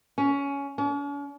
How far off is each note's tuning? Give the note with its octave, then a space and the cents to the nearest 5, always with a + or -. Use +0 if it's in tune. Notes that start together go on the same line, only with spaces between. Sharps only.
C#4 +15
C#4 +45